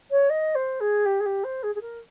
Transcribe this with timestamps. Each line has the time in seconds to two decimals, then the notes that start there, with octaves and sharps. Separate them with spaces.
0.11 C#5
0.29 D#5
0.55 C5
0.80 G#4
1.05 G4
1.19 G#4
1.25 G4
1.43 C5
1.63 G#4
1.75 G#4
1.81 A#4